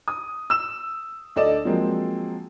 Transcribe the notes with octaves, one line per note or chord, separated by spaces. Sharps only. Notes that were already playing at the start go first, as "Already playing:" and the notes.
D#6
E6 E7
D2 D4 A4 D5 D#5 E7
F3 F#3 G#3 A#3 C4